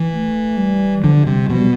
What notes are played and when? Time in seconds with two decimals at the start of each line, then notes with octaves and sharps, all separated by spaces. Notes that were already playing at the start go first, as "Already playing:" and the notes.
Already playing: E3
0.12 A3
0.57 G3
1.03 D3 F3
1.16 F3
1.26 C3 G3
1.49 B2 F3
1.58 G3